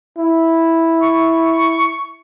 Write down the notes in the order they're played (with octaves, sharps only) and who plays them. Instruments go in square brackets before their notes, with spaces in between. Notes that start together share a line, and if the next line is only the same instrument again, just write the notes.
[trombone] E4
[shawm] C#6